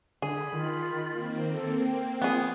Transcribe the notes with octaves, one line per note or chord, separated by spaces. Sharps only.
D3 G#4 B5
D#3 F4
A#3 C4
A4
G5
F3 B3 G#4